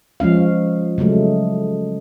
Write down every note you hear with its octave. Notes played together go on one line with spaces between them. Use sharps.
F3 G#3 C#4 F5
C#3 F#3 G#3 A3